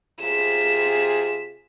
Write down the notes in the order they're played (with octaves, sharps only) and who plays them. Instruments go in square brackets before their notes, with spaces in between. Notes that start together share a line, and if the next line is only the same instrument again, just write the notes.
[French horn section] C3 F4 G#4 [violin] B6 E7